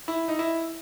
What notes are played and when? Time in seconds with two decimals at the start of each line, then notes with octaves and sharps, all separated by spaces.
0.08 E4
0.28 D#4
0.39 E4